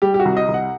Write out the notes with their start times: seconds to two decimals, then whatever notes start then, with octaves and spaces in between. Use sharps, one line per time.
0.02 G3 G4
0.14 G4
0.20 F#4
0.25 C2
0.37 D#5
0.48 C2
0.54 F#5